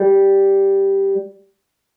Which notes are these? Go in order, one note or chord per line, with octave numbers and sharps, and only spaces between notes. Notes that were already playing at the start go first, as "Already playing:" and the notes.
Already playing: G3